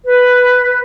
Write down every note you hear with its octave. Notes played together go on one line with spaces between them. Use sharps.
B4